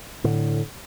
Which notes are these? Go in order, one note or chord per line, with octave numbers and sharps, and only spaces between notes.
A2 D3